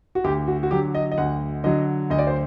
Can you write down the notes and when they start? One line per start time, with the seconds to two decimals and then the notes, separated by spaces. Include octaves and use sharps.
0.15 F#4
0.24 D2 G4
0.48 F#4
0.63 F#4
0.71 D3 F#3 G4
0.95 D#5
1.12 D#5
1.18 D2 F#5
1.64 D3 F#3 D#5
2.10 D2 D#5
2.18 D5
2.27 C5